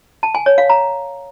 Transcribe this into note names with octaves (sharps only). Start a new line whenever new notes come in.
A5
G#5
C#5
F5
A#5